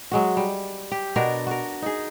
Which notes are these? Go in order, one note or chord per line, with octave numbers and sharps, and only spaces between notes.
F#3 G#3 F#4
G3
G4
B2 D4 F#4 A#4
F#4 A#4
D#4 G#4